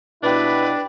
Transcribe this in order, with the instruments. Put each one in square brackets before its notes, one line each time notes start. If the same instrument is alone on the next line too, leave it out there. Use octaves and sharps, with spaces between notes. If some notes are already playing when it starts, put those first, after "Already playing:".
[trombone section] B2 E4 [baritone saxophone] D4 [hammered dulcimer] G4 B5 [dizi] B4